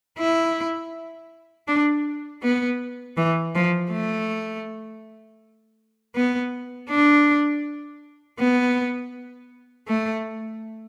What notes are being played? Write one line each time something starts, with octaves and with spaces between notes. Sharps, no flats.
E4
D4
B3
E3
F3
A3
B3
D4
B3
A3